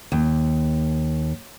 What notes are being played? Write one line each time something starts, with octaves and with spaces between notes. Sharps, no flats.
D#2